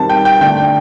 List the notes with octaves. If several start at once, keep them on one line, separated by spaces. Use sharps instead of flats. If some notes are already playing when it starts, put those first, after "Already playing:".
Already playing: D#3 G3 C4 A5
G5
G5
D3 A3 D4 G5
G5